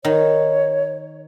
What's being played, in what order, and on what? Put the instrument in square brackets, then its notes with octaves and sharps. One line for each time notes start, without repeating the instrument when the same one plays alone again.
[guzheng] D#3 [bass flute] C#5